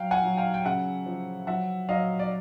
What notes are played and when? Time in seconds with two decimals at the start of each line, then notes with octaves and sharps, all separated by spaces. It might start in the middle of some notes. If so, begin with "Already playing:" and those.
Already playing: F#3 F5 G5
0.11 F#5 G#5
0.24 F#3
0.37 F5 G5
0.54 G5
0.65 C#3 E5 F#5
1.06 F3
1.47 F#3 E5 F#5
1.89 F#3 D#5 F5
2.19 D5